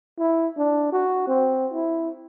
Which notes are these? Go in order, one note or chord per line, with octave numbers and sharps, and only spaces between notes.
E4
D4
F#4
C4
E4